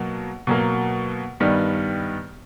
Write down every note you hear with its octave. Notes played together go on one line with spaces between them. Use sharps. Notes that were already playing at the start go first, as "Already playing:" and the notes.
Already playing: B2 F#3 A#3
B2 F#3 A#3
G2 D#3 G3 B3